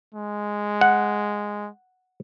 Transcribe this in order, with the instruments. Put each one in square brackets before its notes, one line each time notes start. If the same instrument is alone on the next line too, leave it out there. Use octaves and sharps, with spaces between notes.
[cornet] G#3
[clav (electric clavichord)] F#5